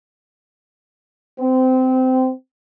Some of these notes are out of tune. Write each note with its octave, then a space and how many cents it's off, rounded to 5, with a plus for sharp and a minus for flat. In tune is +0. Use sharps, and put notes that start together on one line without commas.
C4 -20